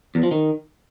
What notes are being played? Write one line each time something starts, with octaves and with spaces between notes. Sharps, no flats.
E2
F3
D#3